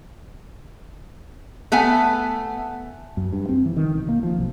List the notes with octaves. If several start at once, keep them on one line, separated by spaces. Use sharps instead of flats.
A3 B3 F#5 G#5
F#2
G2
C4
E3
D#3
B1
A#3
F3
B1